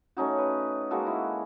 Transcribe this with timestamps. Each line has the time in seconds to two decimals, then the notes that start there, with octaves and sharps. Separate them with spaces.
0.17 A3 C#4 D#4 F#4
0.38 B4
0.90 G#3 A#3 F#4 A4
1.07 E4